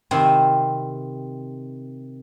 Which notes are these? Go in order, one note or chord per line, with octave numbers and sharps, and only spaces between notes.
C3 D#3 C4 E4